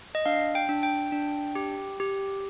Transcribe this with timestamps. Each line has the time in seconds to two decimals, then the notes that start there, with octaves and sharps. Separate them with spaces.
0.15 D#5
0.26 D4 F5
0.55 G5
0.69 D4
0.83 G5
1.12 D4
1.55 G4
2.00 G4